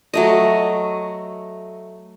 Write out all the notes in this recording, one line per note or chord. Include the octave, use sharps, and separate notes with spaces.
F#3 A3 D#5